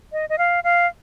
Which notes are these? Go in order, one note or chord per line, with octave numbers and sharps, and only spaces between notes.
D#5
D#5
F5
F5